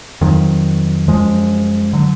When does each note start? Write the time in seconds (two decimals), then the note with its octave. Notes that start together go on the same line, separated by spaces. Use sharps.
0.21 F2 D#3 F#3
1.08 F#2 F3 G#3
1.93 D3 F#3